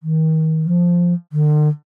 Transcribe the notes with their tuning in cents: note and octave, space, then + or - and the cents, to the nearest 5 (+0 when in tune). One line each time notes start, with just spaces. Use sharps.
D#3 +35
F3 +0
D3 +45